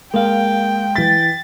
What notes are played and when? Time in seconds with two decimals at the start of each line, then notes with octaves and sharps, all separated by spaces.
0.14 G#3 A#3 F5 G5
0.96 E3 A6 B6